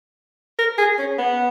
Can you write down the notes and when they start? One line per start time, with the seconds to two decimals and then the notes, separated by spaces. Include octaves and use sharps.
0.59 A#4
0.78 G#4
0.98 C#4
1.18 B3